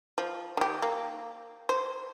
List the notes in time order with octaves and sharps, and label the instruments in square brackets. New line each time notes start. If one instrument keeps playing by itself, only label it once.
[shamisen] F3
D#3 G4
A#3
C5